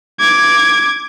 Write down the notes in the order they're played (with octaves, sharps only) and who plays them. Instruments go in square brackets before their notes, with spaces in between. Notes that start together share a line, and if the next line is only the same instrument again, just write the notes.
[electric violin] D6 G#6